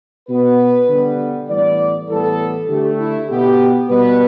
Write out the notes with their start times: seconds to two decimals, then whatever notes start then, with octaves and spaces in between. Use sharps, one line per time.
0.29 B2 B3 B4
0.88 D3 G3 B3
1.49 A2 E3 G3 B3 D5
2.09 A2 E3 G3 B3 A4
2.69 D3 A3 G4
2.99 E4
3.29 B2 B3 G4
3.89 B2 G3 B3 B4